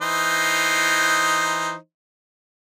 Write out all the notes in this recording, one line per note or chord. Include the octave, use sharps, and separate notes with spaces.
E3 D#4 C5